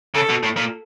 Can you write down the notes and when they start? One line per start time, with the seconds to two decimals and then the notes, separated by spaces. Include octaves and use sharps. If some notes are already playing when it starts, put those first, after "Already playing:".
0.15 C#3 A4
0.29 B2
0.43 A2
0.57 A#2